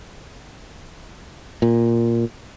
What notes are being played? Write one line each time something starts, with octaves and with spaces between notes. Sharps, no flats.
A#2